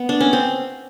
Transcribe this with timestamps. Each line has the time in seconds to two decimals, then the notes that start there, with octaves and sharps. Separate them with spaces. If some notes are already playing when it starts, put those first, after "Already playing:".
Already playing: B3
0.09 D4
0.21 C#4
0.33 C4